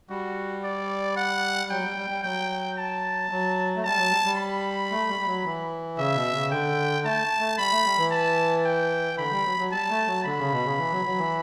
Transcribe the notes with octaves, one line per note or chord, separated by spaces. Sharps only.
G3 F#4
D5
F#5
F#3 G5
G3
G3
G3
F#3 G5
A5
F#3
A3
G3 A5
F#3
G3
G3
B5
A3
G3
G3
F#3
E3
C#3 E5
B2
C#3
D3 G5
A3 A5
A3
G3 B5
A3
G3
E3
A5
G5
D3 B5
G3
F#3
F#3
G3 A5
A3
F#3
D3 B5
C#3
B2
C#3
E3
F#3
F#3
E3